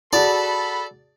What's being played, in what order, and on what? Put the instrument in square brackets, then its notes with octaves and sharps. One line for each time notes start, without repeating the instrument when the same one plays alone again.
[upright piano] F#4 G#4 A5 [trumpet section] A4 B5 [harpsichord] D5